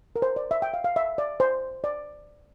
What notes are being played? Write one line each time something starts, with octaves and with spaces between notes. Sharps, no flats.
A#4
C5
D5
E5
G5
F5
F5
E5
D5
C5
D5